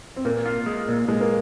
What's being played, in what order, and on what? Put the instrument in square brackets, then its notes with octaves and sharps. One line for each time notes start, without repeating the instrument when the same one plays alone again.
[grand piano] C4
[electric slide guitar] A#2 [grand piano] A#3
[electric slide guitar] F4
G#3
A#2
[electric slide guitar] A#2 [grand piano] G#3
[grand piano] A#3